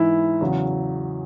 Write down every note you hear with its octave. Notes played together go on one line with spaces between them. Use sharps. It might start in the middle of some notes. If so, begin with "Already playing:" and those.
Already playing: G#2 E3 E4
E2 C#3 F#3